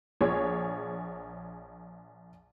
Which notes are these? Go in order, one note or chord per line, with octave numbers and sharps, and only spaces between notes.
A#1 G#4 C#5